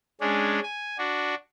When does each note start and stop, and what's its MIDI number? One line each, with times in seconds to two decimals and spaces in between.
0.21 0.60 56
0.21 0.60 61
0.21 0.60 62
0.63 0.97 80
0.98 1.35 62
0.98 1.35 66